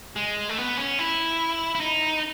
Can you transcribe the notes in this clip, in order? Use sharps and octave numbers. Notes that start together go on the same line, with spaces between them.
G#3
A3
B3
C#4
E4
E4
D#4